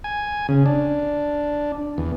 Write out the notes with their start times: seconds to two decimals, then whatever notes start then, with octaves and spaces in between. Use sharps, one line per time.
0.04 G#5
0.49 C#3
0.66 D4
1.98 E2